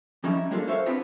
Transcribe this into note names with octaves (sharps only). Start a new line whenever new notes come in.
F3 G3 C#4 D#4 E4
G3 G#3 A#3 D4 F4 A4
A4 C5 C#5 E5 F5
B3 C4 D4 F4 G#4 B4